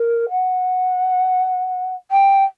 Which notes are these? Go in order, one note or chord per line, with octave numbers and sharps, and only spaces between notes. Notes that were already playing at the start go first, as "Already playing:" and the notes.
Already playing: A#4
F#5
G5